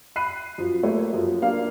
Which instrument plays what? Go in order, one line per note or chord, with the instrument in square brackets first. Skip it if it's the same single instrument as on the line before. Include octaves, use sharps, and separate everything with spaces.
[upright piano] B5 F#6 C7 D#7
F#2 F3
A3 A#3 A4 C#5
F#2 F3
A#3 D4 F5